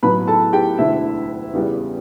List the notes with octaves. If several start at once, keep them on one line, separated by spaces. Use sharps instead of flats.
A1 A2 F#3 B3 B4 B5
A4 A5
G4 G5
E1 D2 D3 E4 E5
E2 C#3 G3 B3